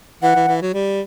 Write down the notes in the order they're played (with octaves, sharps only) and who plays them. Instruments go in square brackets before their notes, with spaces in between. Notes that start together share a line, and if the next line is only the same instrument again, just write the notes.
[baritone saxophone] E3 [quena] F#5
[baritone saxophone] E3
E3
F#3
G3